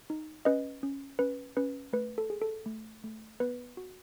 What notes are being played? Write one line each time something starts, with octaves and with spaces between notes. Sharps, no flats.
D#4
C#4 B4 D#5
C#4
C#4 B4
C#4 B4
A3 B4
A4
G#4
A4
A3
A3
B3 B4
F#4